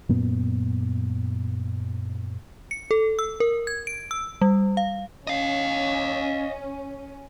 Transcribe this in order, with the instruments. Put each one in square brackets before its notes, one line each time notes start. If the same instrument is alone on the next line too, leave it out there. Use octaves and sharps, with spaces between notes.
[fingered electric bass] F#2 A#2 B3
[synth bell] C#7
A4
E6
A#4
G#6
D7
E6
G3
F5
[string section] C#4 [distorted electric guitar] D#5 F5